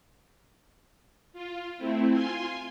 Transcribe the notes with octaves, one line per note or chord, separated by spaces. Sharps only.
F4
A3 C4 E4
F4 G#5 C6